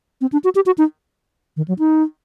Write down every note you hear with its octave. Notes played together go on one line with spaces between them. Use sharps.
C4
D4
F#4
G4
F#4
D#4
D#3
F#3
D#4